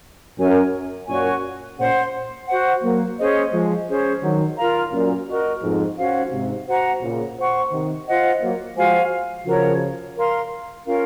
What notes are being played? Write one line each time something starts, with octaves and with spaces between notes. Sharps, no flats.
F#2 A#4 C#5 G#5
F#2 A#2 F#4 C#5 G#5 C#6
A#2 C#3 C5 F#5 C6
F#4 C5 F#5
F#3 A#3
C#4 G#4 C5 D#5
F3 G#3
C#4 G#4 C5
D#3 F#3
F4 A#4 F5 A#5
F#2 A#2
F#4 A#4 D#5
F2 G#2
C#4 F#4 C5 F5
G#2 C3
F#4 C5 F#5 A#5
A#2 C#3
C5 F#5 C#6
C3 D#3
F4 C5 D#5 F#5
F#3 A#3
F3 G#3 F#4 C5 F5 G#5
C#3 F3 F#4 A#4 C#5
A#4 F5 C6
C#4 F4 A#4 F5